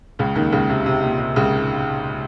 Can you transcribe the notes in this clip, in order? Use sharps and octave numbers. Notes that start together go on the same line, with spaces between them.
C#2 C#3
D#2 D#3
C#2 C#3
C3
C3
A#2
C3
C#2 C#3